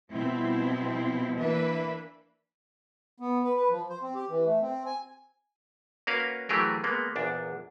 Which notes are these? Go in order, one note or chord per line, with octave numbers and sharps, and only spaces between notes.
B2 F3 G3 C4 E4
E3 A#3 D4 B4 E5
B3
B4
B4
F3
C5
C4
G4
E3
A3
C4
G#5
A#3 C#4 F#4 A#4 B4 F5
E3 F#3 A3 G4 G#4 A#4
G#3 A#3 B3
A#1 E2 D4